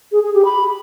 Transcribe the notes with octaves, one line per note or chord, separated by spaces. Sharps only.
G#4
G#4
G4
B5